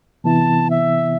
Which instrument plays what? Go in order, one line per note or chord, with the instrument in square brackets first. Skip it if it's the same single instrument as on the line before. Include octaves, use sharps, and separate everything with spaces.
[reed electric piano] C3 E3 B3 E4 [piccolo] A5
[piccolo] E5